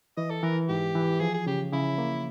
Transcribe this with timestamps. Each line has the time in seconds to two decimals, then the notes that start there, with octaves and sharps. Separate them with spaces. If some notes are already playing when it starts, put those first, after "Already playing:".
0.17 E3 D#5
0.30 A4
0.43 E3 A#4
0.68 G#2 G4
0.95 E3
1.20 F3 G#4
1.34 G#4
1.47 C#3 G4
1.72 C#3 E4
1.98 A#3